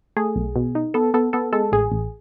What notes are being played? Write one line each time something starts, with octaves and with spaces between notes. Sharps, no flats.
A3 G#4
B1
B2
D#4
B3 A4
B3 A4
B3 A4
G#3 A4
A1 G#4
A1